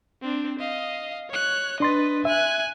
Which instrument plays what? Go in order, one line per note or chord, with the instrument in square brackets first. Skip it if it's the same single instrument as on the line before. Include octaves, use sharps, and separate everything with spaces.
[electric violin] C4 D4
D#5 F5
C#5 F#6
[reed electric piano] D4 C6 A6 [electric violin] B4 D#5
[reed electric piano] E5 [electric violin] G#5 F#6